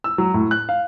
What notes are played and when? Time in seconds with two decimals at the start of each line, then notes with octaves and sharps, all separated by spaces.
0.04 E6
0.18 F#3
0.34 A2
0.51 F#6
0.69 F5